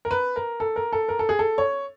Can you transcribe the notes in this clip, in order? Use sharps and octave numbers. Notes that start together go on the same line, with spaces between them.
A#4
B4
A#4
A4
A#4
A4
A#4
A4
G#4
A4
C#5